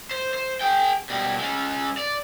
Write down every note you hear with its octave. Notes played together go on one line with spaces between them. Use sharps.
C5
C5
G#4 G5
B2 G3
G#3 C#4
D5